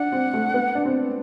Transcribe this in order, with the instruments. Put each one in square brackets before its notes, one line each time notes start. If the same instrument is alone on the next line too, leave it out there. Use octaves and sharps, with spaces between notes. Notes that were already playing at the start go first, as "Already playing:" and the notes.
Already playing: [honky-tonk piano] D4 [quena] F#5
[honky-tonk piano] C4
A3
B3
D4
C4